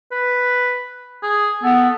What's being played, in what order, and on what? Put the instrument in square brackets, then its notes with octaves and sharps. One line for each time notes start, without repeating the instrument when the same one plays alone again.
[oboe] B4
G#4
[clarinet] B3 [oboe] A4